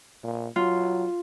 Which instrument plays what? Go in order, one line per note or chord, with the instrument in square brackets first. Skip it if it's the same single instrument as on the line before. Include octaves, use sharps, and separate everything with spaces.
[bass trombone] A#2
[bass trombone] F#3 [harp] F4